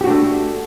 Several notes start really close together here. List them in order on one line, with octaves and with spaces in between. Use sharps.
G4 F#4 D4 A3